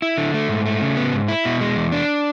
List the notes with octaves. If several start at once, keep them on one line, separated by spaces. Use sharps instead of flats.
E4
D3
A3
G#2
A3
C#3
B3
G#2
E4
B2
G#3
E2
D4